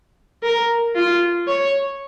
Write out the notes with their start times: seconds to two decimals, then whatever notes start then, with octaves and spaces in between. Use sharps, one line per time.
0.43 A#4
0.96 F4
1.48 C#5